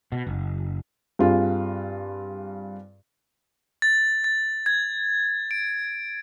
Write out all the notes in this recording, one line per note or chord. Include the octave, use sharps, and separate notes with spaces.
B2
F#1
G2 C4 F4 G#4
A6
A6
G#6
D7